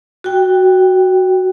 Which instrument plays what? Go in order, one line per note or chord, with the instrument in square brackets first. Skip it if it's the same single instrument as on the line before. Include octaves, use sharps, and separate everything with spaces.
[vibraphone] F#4 G5